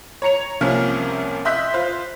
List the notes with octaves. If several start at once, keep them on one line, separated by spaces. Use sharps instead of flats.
C#5 A#5 C#7 F7
C2 C3 F3 A#3 C#4 F6
D#5 E5 C6 F#6 G6 B6
F4 C5